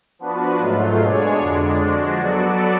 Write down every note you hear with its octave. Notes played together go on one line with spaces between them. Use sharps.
F3 B3 D4 F#4 B4
G#2 F#3 A3 F4
B2 G#3 D4 G#4 C#5
F2 D3 G#3 D4
F3 G#3 D4 F#4
F#3 B3 F#4 A4 D5